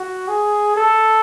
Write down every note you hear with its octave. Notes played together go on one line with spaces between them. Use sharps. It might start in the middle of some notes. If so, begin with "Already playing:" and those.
Already playing: F#4
G#4
A4